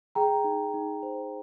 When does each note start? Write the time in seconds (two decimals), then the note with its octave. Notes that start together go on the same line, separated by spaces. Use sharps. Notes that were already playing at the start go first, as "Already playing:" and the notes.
0.15 G#4 G5 A#5
0.44 D#4
0.74 D#4
1.03 C5